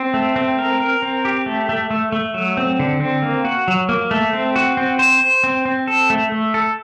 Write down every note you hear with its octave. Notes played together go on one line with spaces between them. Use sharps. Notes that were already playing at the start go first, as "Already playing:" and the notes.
Already playing: C4
A3
C4
A#4
A#4
C4
G4
A3
A3
A3
A3
F#3
C4
D3
C4
A#3
F#4
F#3
A#3
A3
C4
F#4
C4
C5
C5
C4
C4
A4
A3
A3
A4